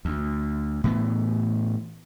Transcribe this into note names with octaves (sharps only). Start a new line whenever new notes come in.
D2
A2 E3 B3